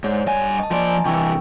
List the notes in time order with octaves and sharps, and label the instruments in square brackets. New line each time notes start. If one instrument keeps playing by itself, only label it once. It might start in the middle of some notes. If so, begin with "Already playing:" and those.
[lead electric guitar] G#2 [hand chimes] C#5 D5 F#5
[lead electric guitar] G2 G#5
[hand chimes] D#5 A5
[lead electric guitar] F3 D5 [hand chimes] G#5 C6
[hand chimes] D#5 G#5 A#5
[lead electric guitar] C3 E3 [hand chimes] G5 C#6 E6